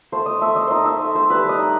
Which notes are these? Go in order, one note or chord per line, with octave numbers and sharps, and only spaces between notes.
A3 C5
D#5
A3 E5
D#5
D#4 C5 D#5
E5
A3
C5
G3 B4
D#5
D#4